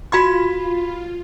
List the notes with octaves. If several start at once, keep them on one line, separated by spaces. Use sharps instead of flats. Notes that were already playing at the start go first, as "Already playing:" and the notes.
F4 F#4 B5 C6 G#6